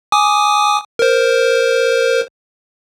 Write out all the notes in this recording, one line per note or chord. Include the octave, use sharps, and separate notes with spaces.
G#5 D6 D#6
A#4 C5